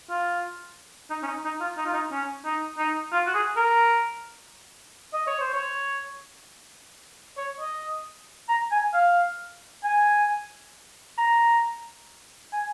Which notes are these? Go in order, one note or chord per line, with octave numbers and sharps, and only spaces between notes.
F4
D#4
C#4
D#4
D#4
F4
D#4
F4
D#4
C#4
D#4
D#4
F4
F#4
G#4
A#4
D#5
C#5
C5
C#5
C#5
D#5
A#5
G#5
F5
G#5
A#5
G#5